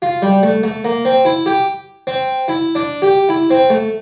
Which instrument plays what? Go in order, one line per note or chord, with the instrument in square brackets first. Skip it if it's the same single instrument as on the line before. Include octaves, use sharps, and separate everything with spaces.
[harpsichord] F4
G3
A3
A3
A#3
C4
E4
G4
C4
E4
D4
G4
E4
C4
A3